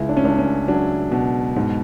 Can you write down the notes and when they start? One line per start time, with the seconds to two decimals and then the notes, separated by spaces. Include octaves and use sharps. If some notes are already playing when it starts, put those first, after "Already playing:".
Already playing: C#2 E4
0.09 D4
0.17 C#4
0.24 C#2 D4
0.38 C#4
0.68 F#3 D4
1.12 B2
1.56 G#2